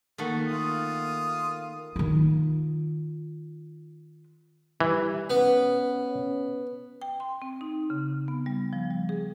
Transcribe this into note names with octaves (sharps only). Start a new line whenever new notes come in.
D#3 A3 A#3 F#4
F4 D#6
D#3 F4
E3 G3
B3 C#4
G5
C6
C4
D#4
C#3
B3
G3
F3
G3
G#4